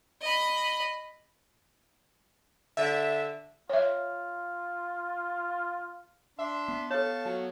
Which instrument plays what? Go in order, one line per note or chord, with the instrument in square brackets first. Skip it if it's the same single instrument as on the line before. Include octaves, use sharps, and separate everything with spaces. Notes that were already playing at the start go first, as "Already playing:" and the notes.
[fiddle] D#5 B5
[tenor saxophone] D3 [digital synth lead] E5
[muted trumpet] F4 [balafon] C#5 E5
[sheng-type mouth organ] D4 C6 [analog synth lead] E5
[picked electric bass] B3
[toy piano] A4 C#5 [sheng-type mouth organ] F5 C#6 [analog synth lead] A5
[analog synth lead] F#3